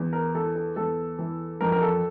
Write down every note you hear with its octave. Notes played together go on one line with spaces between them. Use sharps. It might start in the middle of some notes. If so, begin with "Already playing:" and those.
Already playing: E2
A#4
E3 A4
A4
E2 A4
E3
F2 A#4
A#4
A4